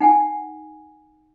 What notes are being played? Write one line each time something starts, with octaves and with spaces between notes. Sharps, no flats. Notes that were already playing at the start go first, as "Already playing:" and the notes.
D#4 F#5 G#5